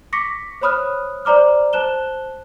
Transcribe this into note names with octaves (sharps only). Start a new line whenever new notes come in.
C#6 D6 A#6 B6 C#7
C5 C#5 B5 D#6 F6 F#6
C5 D5 A#5 D6 F6
C5 A5 F#6 E7 G7